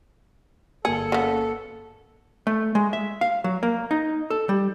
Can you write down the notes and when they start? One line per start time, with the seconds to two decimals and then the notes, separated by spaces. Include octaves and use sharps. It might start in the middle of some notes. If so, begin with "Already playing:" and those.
0.85 G1 A#3 G#4 A4 C#7
1.12 C#3 B3
2.47 A3
2.75 G#3
2.93 E5
3.21 F5
3.44 F#3
3.63 A#3
3.91 D#4
4.30 A4
4.49 G3